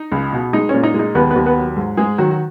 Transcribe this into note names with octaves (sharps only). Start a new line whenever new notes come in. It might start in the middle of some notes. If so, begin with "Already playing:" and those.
Already playing: D#4
C#2
B2
G#3 D#4
A#2 C#4
D#4
G#3
D#4
D#2 B3 B4
B3 B4
D#2
B3 B4
F#3
G#2
G#2 G#3 G#4
D#3 F#3 F#4
F#4